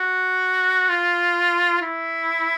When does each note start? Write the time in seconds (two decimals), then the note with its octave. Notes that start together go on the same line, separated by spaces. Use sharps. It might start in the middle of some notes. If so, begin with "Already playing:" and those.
Already playing: F#4
0.89 F4
1.81 E4